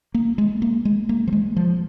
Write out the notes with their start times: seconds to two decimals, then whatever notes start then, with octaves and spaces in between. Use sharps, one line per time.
0.14 A#3
0.38 G#3
0.62 A#3
0.85 G#3
1.09 A#3
1.28 F3
1.33 G#3
1.56 F3